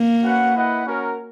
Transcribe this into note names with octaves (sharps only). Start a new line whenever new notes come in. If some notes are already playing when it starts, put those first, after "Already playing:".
Already playing: A#3
C#4 F#4 B4 F#5
E4 B4 D#5 F#5
C#4 F#4 A#4